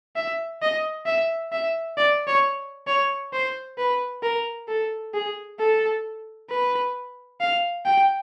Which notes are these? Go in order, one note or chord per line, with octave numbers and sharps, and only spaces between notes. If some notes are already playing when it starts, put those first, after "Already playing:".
E5
D#5
E5
E5
D5
C#5
C#5
C5
B4
A#4
A4
G#4
A4
B4
F5
G5